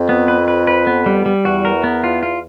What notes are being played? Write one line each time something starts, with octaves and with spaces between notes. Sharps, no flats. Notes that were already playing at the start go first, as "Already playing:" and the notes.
Already playing: F2
B3
B4
B4
B4
B3
G3
G3
E2 F#4
A#4
B3
F4
F4